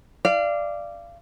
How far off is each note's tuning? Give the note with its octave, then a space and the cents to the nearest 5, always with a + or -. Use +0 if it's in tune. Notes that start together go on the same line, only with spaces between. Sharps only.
D5 +0 F5 -30